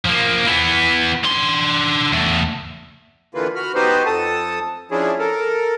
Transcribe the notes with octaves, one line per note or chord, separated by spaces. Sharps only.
F3 A#3
E3 B3
D3 C6
E2 A3
D3 E3 A#3 F4 B4
F#4 B5 F6
B3 D#4 F#4 G4 B4 C5
F2 A4 A5 D#6
F3 C#4 D4 E4 G#4
A4 A#4